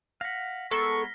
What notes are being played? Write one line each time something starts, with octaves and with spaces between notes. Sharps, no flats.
F5 F#5 A#6 B6
G#3 B3 A4 A#4 C#6 F6 C7